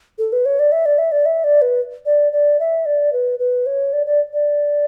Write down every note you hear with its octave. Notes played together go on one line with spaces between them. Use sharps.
A4
B4
C#5
D5
E5
D5
E5
D5
E5
D5
B4
D5
D5
E5
D5
B4
B4
C#5
D5
D5
D5